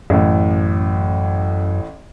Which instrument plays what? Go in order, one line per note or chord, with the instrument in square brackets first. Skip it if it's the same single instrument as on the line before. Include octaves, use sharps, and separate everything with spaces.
[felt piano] A1 A2 [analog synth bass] F#2